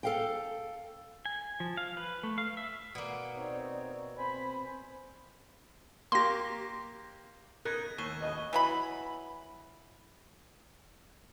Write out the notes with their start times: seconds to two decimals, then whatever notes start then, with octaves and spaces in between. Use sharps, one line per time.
0.03 A4 F5 G5
1.26 G#5
1.60 F3
1.77 F5
1.97 B4
2.23 A3
2.38 F5
2.57 E5
2.95 B2 A#3 D5
3.37 C4 D#4 C#5
4.18 C4 C5 G#5 B5
6.12 A#3 G4 C6 A#6
7.65 C#3 B3 D#4 A#4 F#6 G#6
7.98 D#2 A3 C5 G#5 C#6 G7
8.21 B1 A2 C#3 D#5
8.53 E3 F#3 B5